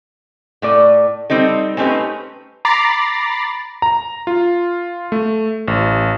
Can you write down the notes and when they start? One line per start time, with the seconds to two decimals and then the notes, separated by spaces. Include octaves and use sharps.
0.62 A2 A3 D5
1.30 G3 C4 D#4 A4
1.77 A3 C4 C#4 D#4 G4 B4
2.65 A#5 B5 D6 A6 C7
3.82 A#5
4.27 F4
5.12 A3
5.68 A1